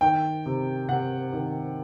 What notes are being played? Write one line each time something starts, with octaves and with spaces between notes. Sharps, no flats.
D#3 G5
C3
C3 F#5
D#3